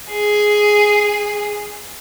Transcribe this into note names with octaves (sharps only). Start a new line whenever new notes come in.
G#4